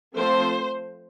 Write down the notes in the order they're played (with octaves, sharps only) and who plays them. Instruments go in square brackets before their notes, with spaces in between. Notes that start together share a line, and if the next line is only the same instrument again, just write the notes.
[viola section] F3 A3 C4 C5